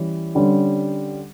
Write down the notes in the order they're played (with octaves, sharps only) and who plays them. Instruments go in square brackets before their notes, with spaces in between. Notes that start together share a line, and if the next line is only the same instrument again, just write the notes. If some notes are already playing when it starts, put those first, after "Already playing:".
Already playing: [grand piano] E3 G3 C#4
D3 G3 C#4